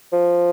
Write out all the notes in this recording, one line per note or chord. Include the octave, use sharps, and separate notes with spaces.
F3